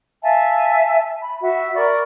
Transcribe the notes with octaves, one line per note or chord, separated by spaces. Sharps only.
E5 F5 G#5 A5
B5
F#4 E5
A#4 D5 B5 C#6